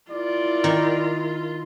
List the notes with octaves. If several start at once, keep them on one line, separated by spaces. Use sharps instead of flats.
E4 F4 A#4 D5
D#3